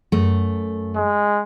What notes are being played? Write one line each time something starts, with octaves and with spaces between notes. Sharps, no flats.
F#2 A3
G#3